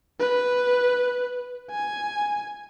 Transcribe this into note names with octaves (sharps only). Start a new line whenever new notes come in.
B4
G#5